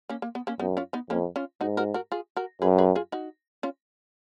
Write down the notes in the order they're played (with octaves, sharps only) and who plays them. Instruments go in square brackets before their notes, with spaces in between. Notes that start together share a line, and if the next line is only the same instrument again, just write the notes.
[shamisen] A#3 C#4
A#3
B3
A#3 C#4
[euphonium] F#2 [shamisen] B3 D#4
[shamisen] C#4 F4
B3 D#4
[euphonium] F2 [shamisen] A#3 C#4
[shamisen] C#4 F4
[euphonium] G#2 [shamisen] D#4 F#4
[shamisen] F#4 A#4
F#4 A#4
F4 G#4
F#4 A#4
[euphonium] F#2 [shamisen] G#4 B4
[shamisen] G#4 B4
F4 G#4
D#4 F#4
C#4 F4